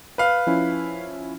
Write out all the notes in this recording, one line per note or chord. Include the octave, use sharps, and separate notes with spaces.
B4 F5
F3 C#4 E4